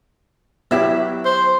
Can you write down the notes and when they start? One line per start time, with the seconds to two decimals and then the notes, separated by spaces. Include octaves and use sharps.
0.71 F#3 B3 E4 G4 E5
1.25 C5